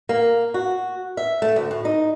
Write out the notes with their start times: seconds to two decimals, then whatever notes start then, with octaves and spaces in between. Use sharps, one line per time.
0.09 A#3
0.54 F#4
1.17 E5
1.42 A3
1.56 D2
1.71 A2
1.85 D#4